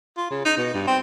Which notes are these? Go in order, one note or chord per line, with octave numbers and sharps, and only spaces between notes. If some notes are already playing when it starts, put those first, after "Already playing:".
F4
C#3
D#4
B2
G2
C4